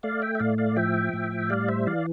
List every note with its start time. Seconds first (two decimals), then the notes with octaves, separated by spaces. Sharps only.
0.03 A3 D5 F5
0.22 E5 G5
0.35 E5
0.40 A2 D5 F5
0.58 D5 F5
0.76 F3 E5 G5
1.13 A2
1.50 G3 D5 F5
1.68 C5 E5
1.87 E3 D5 F5